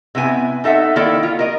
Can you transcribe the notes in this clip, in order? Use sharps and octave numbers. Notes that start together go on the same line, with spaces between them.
C3 B3 E4 G#5
D#4 A4 E5 F#5
D#3 A#3 E4 A4 D5
F4
A#4 D#5